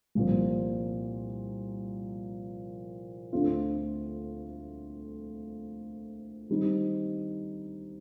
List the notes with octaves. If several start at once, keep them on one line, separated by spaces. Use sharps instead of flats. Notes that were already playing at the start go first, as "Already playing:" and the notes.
C2 A#2 F3 C4
D2 D3 A3 C4 F4
D#3 G3 C4 D#4